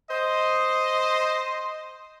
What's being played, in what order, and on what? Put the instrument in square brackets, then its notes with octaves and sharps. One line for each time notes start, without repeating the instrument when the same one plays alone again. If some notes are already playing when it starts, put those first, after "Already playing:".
[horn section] C5 D#5